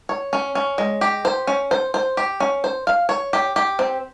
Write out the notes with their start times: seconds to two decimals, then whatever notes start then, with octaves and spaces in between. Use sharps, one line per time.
0.09 C#5
0.33 C#4
0.55 C#4
0.78 G#3
1.01 G4
1.25 C5
1.47 C#4
1.71 C5
1.94 C5
2.17 G4
2.40 C#4
2.64 C5
2.87 F5
3.09 C#5
3.33 G4
3.56 G4
3.79 C4